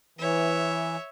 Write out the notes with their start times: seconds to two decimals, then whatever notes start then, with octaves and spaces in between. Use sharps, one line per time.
0.19 E3 C#5 E5